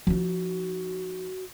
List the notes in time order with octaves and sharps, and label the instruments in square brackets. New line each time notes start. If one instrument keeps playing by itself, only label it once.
[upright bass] F3 D#4 [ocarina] F#4